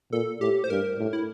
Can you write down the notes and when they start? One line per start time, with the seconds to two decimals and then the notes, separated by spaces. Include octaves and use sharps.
0.12 A#2 A4
0.40 A2 G4
0.64 C5
0.70 G2 A#4
0.99 A2
1.13 E4